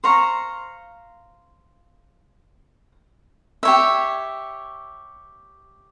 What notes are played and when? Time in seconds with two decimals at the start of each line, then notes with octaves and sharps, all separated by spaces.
0.04 C5 F5 A#5 C#6
3.63 G4 C#5 E5